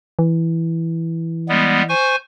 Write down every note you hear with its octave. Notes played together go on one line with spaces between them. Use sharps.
E3
G3 G#3 B3
C5 G#5 C#6